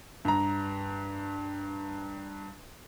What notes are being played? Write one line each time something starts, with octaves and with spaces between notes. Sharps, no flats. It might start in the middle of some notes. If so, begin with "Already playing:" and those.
G2 A#5